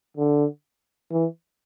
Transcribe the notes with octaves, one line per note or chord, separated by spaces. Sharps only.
D3
E3